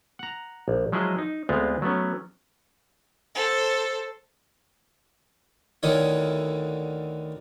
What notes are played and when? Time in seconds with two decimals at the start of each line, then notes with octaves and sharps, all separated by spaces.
0.19 F#5 A#5
0.68 A#1
0.92 F3 F#3 G#3 E4 G#4 D#5
1.18 D#4
1.49 D2 G#3 B3 C4 F4
1.82 F#3 A3 B3 C#4
3.35 A4 C5
5.83 D2 D3 D#3 E4 C#5